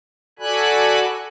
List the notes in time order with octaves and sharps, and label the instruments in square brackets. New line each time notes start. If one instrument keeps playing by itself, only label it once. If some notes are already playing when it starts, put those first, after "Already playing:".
[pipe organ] F#4 A4 D5 G#5 B5 F#6